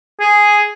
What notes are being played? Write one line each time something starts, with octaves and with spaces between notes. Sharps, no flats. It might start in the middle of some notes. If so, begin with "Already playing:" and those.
G#4